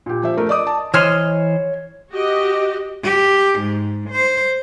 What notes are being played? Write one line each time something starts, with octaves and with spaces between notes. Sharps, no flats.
A#2 G4
F3 E5
A3 A#4
D5 D#5 D6 D#6
A5
E3 C5 C#5 D#5 F6
F#4 G4 D#5
G4
G#2
C5